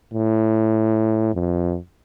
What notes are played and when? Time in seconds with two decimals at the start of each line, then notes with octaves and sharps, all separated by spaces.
0.13 A2
1.34 F2